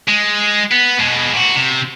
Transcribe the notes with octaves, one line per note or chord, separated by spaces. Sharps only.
G#3
B3
B2 G#3
A#2 F#4
C3